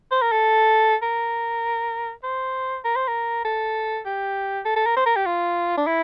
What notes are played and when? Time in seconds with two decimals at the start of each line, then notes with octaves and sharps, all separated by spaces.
0.11 C5
0.22 A#4
0.32 A4
1.03 A#4
2.24 C5
2.84 A#4
2.96 C5
3.08 A#4
3.45 A4
4.06 G4
4.66 A4
4.76 A4
4.86 A#4
4.96 C5
5.06 A#4
5.16 G4
5.26 F4
5.78 D4
5.87 E4